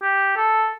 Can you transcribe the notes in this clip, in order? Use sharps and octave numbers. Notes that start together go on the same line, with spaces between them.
G4
A4